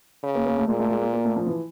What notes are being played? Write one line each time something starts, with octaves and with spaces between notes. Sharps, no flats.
C#3
A#3
A#3
A3
A#2 G#3
A3
G#3
A#3
A#3
A3
F3
E3